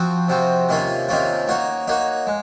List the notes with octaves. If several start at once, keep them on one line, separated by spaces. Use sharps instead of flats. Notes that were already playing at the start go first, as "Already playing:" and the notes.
Already playing: F3 C4 F#4
C3 F3 C4 F#4
C3 D#3 A#3 C#4 F4
C3 D#3 A#3 C#4 F4
A#3 D#4 F#4 C#5
A#3 D#4 F#4 C#5
G#3